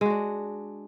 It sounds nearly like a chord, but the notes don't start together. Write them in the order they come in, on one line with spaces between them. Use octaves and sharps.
G#3 F#4 D4